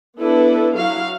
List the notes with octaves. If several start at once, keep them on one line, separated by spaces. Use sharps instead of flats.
B3 D4 E4 A4 B4
F#3 E4 F#4 F5